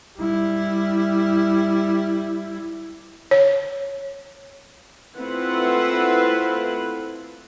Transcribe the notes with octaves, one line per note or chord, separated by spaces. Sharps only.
G3 E4
C#5
A3 C4 E4 F4 B4 F#5